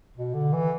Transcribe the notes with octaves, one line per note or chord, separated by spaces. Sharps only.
B2
D3
E3